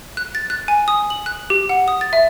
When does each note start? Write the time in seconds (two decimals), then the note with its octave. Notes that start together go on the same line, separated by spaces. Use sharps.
0.17 F#6
0.35 A6
0.50 F#6
0.68 G#5
0.88 D#6
1.10 F#7
1.26 F#6
1.50 G4
1.69 F#5
1.88 D#6
2.01 A6
2.13 E5